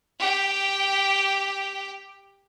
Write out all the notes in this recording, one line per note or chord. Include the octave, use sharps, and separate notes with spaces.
G4 G5